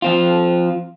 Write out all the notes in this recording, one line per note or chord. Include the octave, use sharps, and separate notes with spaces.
F3 C4 F4